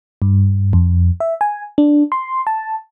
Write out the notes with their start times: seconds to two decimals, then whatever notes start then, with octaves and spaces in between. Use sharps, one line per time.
0.22 G2
0.73 F2
1.20 E5
1.41 G#5
1.78 D4
2.12 C6
2.47 A5